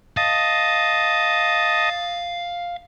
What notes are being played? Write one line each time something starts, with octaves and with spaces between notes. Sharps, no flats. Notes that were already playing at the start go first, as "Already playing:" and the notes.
D#5 F5 A5